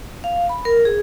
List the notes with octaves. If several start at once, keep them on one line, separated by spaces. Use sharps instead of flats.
F5
B5
A#4
G#4